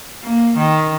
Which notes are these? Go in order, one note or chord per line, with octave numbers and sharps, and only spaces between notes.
A#3
D#3